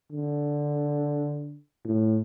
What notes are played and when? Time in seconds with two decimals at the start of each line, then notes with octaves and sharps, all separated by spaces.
0.12 D3
1.85 A2